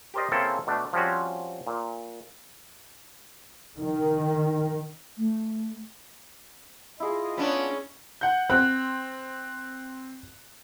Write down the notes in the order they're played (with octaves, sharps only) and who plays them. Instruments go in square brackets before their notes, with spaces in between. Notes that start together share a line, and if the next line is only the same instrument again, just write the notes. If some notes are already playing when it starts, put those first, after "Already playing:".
[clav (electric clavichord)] G4 A#4 C5 D5 D#5
C#3 A#3 C4 E4 A4 A5
B2 A3 D4
F3 G3 C4 C#4 F#4
A#2
[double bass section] D#3
[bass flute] A3
[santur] E4 G#4 [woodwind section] F4 D#5
[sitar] B3 D4 [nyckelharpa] C#4
[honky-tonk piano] F#5 G6
[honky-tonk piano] C4 [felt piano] F#6